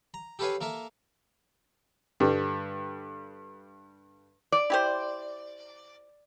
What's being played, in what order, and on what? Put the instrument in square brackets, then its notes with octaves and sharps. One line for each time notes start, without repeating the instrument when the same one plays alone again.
[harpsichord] A#5
G4 A4 B4 C#5 F5 G#5
A#3 A4 A#4 E5
[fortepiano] G2 D3 G3
[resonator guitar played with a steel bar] D5
[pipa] E4 G4 C5